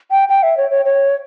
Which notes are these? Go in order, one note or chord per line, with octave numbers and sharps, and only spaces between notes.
G5
G5
E5
C#5
C#5
C#5